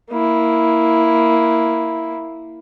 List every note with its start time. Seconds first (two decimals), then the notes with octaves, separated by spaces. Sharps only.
0.11 A#3 E4